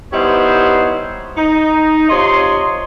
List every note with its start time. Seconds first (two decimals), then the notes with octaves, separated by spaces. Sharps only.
0.13 G3 B3 D#4 E4 C5 C#5
1.37 D#4
2.10 C3 F4 C#5 D#5 C6